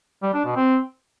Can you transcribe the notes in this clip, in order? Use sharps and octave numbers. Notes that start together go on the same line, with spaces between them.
G3
D4
B2
C4